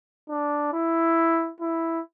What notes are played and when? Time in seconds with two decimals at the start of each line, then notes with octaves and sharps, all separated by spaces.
0.29 D4
0.73 E4
1.61 E4